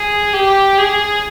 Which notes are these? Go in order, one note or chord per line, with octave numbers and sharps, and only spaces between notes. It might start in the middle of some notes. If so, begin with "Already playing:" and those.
Already playing: G#4
G4
G#4